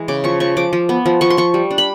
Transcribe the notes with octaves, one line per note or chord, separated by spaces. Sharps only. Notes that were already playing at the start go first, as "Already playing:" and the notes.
Already playing: E3 G#3
C#3 D6
F3 C#6
F3 C#6
F3 D6
F3
B3
F3
F3 C#6
C6
F3 C#6
G3
D4
B5